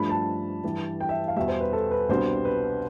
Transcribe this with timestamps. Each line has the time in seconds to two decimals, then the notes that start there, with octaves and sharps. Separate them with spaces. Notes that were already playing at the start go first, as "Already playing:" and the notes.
Already playing: G2 F3 A3 D4 B5
0.09 A5
0.64 G2 E3 G3
1.00 G5
1.09 E5
1.28 F5
1.36 E2 B2 G3 E5
1.48 C5
1.61 B4
1.73 A4
1.91 B4
2.09 C2 B2 G3 B3 D4 C5
2.45 B4